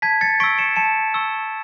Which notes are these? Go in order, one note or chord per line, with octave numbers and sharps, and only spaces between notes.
A5 G#6 B6
A6 C#7
C#6 E6 B6 D7
C#7 E7
A5 C#7 E7
C#6 E6